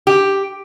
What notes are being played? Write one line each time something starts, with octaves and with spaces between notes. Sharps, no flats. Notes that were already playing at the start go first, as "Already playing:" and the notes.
G4